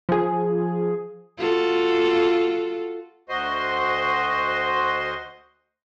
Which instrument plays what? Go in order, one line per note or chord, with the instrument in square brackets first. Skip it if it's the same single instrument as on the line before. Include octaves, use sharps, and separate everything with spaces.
[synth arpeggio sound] F3 G#4
[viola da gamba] F4 F#4 A4
[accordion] D2 F#4 C5 D#5 C6